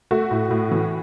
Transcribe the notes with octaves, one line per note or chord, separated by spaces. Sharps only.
A3 F#4
A2
A2
E3